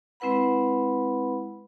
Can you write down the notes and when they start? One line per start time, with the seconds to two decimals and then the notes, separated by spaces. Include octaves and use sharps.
0.20 G#3 C4 E4 B4 F#5 B5